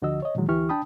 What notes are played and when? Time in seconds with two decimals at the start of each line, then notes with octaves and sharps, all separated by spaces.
0.02 D2 D3 F3 F#4 D#5 E6
0.22 C#5 D#5
0.35 A#2 D#3 E3 F#3 G#3
0.48 D2 E3 E4 G4 C#6 F6
0.69 D4 G5 A5 B5 D#6